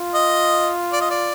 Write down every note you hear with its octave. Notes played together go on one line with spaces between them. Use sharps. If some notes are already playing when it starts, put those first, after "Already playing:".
Already playing: F4
D#5
D5
D#5
D5